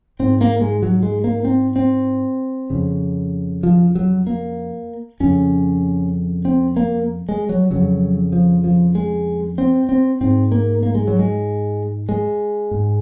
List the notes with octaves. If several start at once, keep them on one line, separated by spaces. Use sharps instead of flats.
G#2 C4
A#3
G#3
F#3
G#3
A#3
C4
C4
F2 C#3
F3
F#3
A#3
F2 C#3 C#4
C4
A#3
G#3
F#3
F2 C#3 F#3
F3
F3
G#3
C4
C4
G#2 C4
A#3
A#3
G#3
F#3
G#3
G#3
G#2